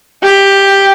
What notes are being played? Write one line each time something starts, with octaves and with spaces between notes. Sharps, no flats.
G4